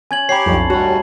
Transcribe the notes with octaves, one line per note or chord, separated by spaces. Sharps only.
C#4 G#5 G#6 F#7
G4 C5 C#5 A#5 B5 C7
B1 F2 D4 C#5 A5
D#2 A2 G3 F#4 C#5